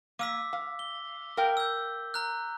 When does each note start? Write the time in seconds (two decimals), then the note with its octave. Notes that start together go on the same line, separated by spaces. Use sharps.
0.19 A#3 D6 E6 B6
0.53 F5
0.79 G7
1.37 A#4 F5 G5
1.57 E6 G6
2.14 A#5 F6 F#6